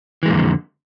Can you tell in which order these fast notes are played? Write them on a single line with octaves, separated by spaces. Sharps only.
E3 G#3 A#2 F2 D3